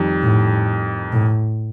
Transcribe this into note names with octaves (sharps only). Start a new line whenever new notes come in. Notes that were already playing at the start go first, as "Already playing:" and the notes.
Already playing: F2 D#3 G3
A2
A2